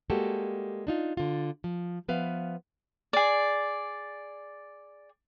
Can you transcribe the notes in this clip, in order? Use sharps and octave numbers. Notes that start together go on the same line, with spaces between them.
G3 G#3 A#3 F#4 G4 A4
D4 D#4 F4
D3 F4
F3
F3 B3 B4 E5 F5
G#4 D5